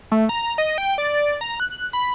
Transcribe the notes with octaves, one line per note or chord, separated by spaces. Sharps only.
A3
A#5
D#5
G5
D5
A#5
F#6
B5